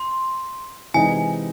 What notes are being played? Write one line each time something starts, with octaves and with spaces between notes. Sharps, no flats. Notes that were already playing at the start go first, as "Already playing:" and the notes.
Already playing: C6
C3 E3 G#3 D#4 G#5